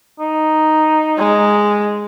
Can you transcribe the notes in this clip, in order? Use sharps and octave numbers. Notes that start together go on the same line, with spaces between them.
D#4
G#3